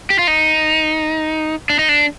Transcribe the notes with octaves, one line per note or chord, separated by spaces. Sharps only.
G4
F4
D#4
D4
D#4
D4